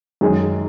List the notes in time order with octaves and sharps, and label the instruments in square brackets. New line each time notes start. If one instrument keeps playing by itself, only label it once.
[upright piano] F#2 D#3 G#3 D#4 G#4